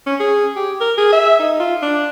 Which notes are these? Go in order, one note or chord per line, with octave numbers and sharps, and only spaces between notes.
C#4
G#4
G4
A#4
G#4
E5
D#4
F4
D4